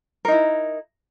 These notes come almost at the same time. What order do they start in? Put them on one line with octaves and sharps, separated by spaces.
A#4 D#4 E4